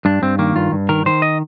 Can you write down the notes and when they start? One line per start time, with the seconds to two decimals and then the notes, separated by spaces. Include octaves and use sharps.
0.05 G2 D4
0.22 G2 C4
0.39 D#3 A#3
0.56 G2 F4
0.72 G2
0.89 D#3 A#4
1.06 D#3 C5
1.22 D#5